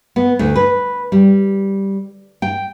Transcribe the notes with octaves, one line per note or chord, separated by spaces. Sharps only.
B3
D2
B4
G3
G5